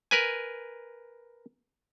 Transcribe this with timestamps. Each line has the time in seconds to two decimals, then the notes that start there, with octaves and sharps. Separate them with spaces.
0.11 A#4 B4 G#5